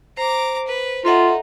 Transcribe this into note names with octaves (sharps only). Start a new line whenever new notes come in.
C5 A#5 D6
B4
D#4 F4 A4 E5 F#5